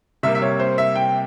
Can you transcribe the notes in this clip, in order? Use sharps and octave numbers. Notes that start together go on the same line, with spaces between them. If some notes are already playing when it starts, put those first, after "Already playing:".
C3 G3 A#3 E5
E5
C#5
C5
E5
G5